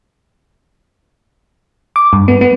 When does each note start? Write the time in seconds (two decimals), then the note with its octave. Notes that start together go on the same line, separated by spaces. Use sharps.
1.96 D6
2.13 G2
2.28 B3
2.41 B3